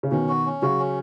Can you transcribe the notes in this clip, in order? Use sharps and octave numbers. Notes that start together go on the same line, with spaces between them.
C#3
B2 D#3 C#4
F#4
C#4
C#3 F#3 F#4
C#4